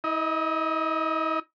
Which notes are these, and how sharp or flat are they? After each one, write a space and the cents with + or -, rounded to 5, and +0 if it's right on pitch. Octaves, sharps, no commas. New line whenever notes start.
E4 -40 D#5 +5